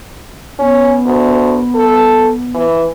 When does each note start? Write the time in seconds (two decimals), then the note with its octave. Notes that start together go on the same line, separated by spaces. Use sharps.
0.60 B3 C#4
1.06 D2
1.75 A4
2.55 E3